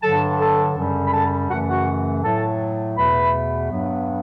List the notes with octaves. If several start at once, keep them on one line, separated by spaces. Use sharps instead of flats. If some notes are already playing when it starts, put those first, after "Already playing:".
G2 D3 F#3 A4 A5
A4 A5
F#2 C#3 G3
B5
A4 A5
F#2 C#3 E3 A3 F#4 F#5
F#4 F#5
A2 F#3 A3 A4 A5
E2 B2 A3 B4 B5
G2 F#3 B3